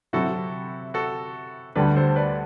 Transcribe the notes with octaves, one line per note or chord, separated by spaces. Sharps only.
C3 F#3 C4 E4 F#4 A4
F#4 A4
D2 D3 G3 G4 B4
A4 C5
B4 D5